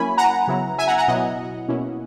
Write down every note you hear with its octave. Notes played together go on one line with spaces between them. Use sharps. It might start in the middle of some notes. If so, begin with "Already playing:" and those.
Already playing: F#3 A#3 C#4 E4 G#5 B5
F#5 A#5
C#3 F#3 B3 E4
E5 G#5
F#5 A#5
F#5 A#5
B2 F#3 B3 E4 D#5 F#5
B2 A#3 C#4 E4